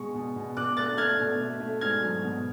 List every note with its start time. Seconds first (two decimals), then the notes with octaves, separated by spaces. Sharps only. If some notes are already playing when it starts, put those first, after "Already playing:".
Already playing: B2 G#3 C#6
0.14 B2
0.36 B2
0.57 B2 D6 F#6
0.77 A3 F#6 A6
0.98 A3 F6 G#6
1.19 B2
1.40 A3
1.60 A3
1.81 G#2 F6 G#6
2.03 F#3
2.24 B2